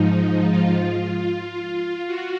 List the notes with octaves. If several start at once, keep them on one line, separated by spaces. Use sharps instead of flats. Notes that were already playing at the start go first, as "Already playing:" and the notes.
Already playing: G#2 F3 D#4
F4
F#4